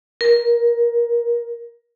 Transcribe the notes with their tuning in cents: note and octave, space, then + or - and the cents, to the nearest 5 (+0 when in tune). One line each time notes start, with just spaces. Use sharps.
A#4 +15